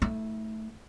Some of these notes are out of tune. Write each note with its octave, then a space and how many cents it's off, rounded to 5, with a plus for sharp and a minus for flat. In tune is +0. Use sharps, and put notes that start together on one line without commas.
A3 +0 E4 -45